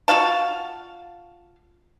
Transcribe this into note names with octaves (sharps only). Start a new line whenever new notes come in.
F4 F#4 F5 A5